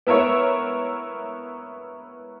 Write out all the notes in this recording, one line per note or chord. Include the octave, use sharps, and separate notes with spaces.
B3 E4 A#4 C#5 E5